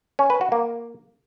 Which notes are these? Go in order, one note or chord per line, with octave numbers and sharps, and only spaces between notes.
C#4
B4
F#4
A#3